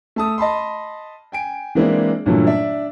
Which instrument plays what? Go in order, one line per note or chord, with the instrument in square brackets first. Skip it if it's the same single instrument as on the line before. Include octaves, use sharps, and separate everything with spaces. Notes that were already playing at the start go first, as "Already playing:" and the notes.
[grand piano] A3 A5 D#6
D#5 A5 B5 C6
G5 G#5 D7
E3 G#3 A#3 C4 D4 E4
G2 A#2 D3 E3 F#3 A3
D4 D5 E5